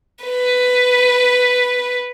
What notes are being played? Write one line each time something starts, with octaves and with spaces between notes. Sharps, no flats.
B4